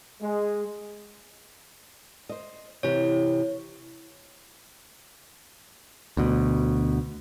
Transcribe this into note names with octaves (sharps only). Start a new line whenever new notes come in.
G#3
C5 D#5
C3 E3 G4 C#5
D2 B2